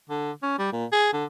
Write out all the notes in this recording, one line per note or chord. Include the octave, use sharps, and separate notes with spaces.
D3
C#4
G3
A#2
G#4
D3